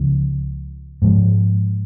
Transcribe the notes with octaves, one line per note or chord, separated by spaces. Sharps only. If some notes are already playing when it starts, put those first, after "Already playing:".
Already playing: C#2 C#3 F3
G#2 F3 G#3